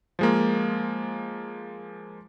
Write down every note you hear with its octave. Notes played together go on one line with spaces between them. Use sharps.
F3 G#3 A#3